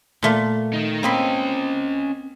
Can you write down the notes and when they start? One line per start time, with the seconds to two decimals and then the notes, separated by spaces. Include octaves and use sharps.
0.23 A#2 A3 F4
0.73 D#4 A#4
1.03 A#3 C4 C#4 D#5 B5